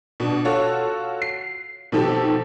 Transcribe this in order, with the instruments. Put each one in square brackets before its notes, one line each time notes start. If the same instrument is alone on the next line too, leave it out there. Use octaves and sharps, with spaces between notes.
[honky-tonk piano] B2 D4
F4 F#4 A4 C#5
C7
B2 D#3 F3 C4 G4 A4